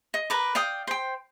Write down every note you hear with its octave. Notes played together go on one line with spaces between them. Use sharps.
D#5
A#4 B4 D6
D5 F5 G5 D#6
C5 G5